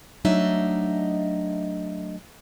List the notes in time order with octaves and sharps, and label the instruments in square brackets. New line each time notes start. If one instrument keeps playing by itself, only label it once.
[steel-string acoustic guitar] F#3 A3 D4 D#4 D#5 E5